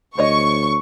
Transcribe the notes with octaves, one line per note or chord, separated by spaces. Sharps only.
D2 C5 C#5 D#5 C#6